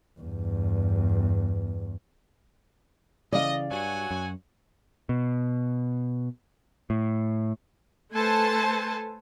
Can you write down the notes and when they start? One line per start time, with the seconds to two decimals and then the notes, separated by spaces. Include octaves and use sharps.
0.20 E2 G2
3.33 C#3 E3 D5 D#5 F5
3.71 G2 F#3 F#4 G#5
4.11 F#2
5.09 B2
6.90 A2
8.13 A3 A4 B4 C5 G#5 A5